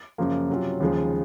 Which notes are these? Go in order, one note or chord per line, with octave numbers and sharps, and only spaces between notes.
F#2 C#3 F3 A#3 F4
C3 F#3 C#4 F4
D#2 C#3 F3 G#3